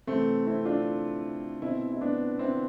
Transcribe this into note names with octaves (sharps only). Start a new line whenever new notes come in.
C3 E3 A3 C4
C4 E4
D4 F4
B2 C4 E4
E4
B3 D4
C4 E4